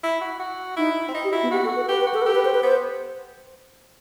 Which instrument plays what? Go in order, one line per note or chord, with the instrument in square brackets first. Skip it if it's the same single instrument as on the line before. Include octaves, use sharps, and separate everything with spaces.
[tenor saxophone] E4
F#4
F#4
[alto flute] D#4 [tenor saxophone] E4
[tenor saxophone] C4
D#4
[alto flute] G4
[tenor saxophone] E4 [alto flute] F#4
[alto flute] B3
[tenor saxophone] F#4 [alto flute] G4
[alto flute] A4
B4
[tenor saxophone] G4 [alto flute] B4
[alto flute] B4
[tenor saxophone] F#4
[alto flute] A4
B4
[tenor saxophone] G4 [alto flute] A4
[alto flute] B4
C5
B4
[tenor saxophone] B3 [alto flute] C5